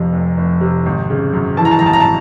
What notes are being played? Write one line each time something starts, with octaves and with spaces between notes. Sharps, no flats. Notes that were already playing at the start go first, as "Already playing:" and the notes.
Already playing: F1 F2 C3
F1
F1
C3
G#1
C#3
F#2
E3 A5
A#5
A5
G#1 A#5
A5
A#5
A5